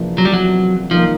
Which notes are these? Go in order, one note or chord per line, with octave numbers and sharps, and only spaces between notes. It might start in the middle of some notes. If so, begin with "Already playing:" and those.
Already playing: E2 C3 F3 A#3 D4
F#3
G3
F#3
D#3 F3 G3 A#3